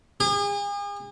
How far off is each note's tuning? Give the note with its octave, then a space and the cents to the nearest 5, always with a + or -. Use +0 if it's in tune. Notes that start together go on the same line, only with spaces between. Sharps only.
G#4 -40